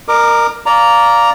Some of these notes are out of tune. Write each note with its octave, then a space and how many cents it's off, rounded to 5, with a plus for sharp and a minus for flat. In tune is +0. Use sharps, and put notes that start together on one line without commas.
A#4 +0 D#5 -45 D6 +15
D5 -15 F5 +0 A#5 +0